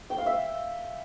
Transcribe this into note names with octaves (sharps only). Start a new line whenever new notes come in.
G5
F5
E5